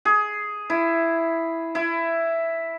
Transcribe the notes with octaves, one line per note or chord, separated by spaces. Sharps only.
G#4
E4
E4